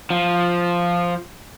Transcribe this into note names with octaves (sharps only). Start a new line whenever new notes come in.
F3